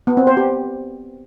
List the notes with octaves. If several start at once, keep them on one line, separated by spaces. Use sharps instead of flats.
B3
C4
C5
G4